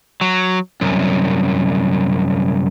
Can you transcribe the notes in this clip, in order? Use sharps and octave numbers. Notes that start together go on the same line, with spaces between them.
F#3
C2 F#2